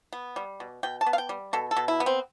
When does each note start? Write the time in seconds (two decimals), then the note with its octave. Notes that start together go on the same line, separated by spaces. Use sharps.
0.13 B3
0.36 G3
0.60 B2
0.83 B2 G5
1.01 A5
1.06 B3
1.13 F5
1.18 G5
1.29 G3
1.53 B2 A4
1.71 A4
1.77 B2
1.88 E4
2.00 B3
2.06 C4